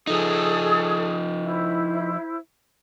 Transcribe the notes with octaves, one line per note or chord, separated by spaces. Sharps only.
F3 D#4 G#4 A4 D#6
E4 C5